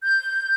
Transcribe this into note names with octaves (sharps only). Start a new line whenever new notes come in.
G6